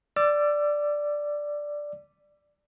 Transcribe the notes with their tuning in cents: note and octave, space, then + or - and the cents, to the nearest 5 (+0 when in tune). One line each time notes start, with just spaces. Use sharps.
D5 +0 E6 +35